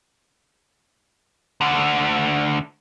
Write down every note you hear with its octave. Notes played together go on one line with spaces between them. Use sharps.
D2 D3